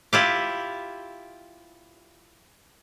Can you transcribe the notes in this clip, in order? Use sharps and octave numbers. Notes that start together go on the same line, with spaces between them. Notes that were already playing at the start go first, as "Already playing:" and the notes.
E4 F4 G4